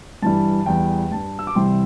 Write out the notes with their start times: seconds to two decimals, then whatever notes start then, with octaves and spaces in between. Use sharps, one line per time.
0.22 G2 E3 G3 A5
0.66 E2 E3 G3 G5
1.11 G2 G3 A5
1.39 E6
1.47 D6
1.55 C2 C3 E3 G3 G5 C6